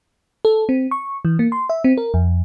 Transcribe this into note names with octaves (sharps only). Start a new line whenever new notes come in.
A4
C4
C#6
E3
A#3
C6
E5
C4
A#4
F2